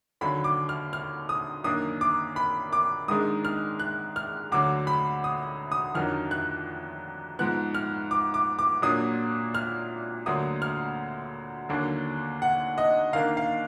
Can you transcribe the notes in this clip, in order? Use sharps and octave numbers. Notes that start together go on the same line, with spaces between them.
D#2 D3 F#3 B5
D6
F6
F6
D#6
F#2 D#3 A#3 D4 D#6
D6
B5
D6
G#2 D#3 G#3 D4 D#6
F6
F#6
F6
D2 D3 F#3 D6
B5
D#6
D#6
F2 D#3 F#3 D4 F6
F#6
G#2 F3 B3 F#6
F6
D6
D6
D6
A#2 F#3 A#3 D4 D#6
F6
D2 D3 F#3 A#3 D#6
F6
D#2 D3 F#3 A#3 D4
F#5
D#5
D#2 D#3 A#3 D4 F5
F5